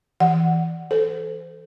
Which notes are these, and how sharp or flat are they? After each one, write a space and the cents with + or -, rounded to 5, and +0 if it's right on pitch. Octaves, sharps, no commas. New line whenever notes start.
E3 +0 F#5 +0
A4 +0 C5 -30